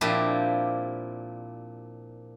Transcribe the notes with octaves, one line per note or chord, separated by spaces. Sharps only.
A#2 F3 C4 D4 E4 G4